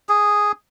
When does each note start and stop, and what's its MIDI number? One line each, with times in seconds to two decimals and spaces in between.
0.09 0.52 68